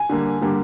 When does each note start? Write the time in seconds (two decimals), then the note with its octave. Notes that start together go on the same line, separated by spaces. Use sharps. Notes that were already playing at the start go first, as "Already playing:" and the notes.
Already playing: G#5
0.09 D3 G3 A#3
0.41 D3 G3 A#3